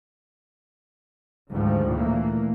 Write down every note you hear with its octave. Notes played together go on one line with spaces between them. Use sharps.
D2 G#2 D3 D#3 F3
A#2 E3 A3 A#3